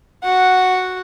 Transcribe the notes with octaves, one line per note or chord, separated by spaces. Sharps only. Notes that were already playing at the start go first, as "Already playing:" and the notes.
F#4 F#5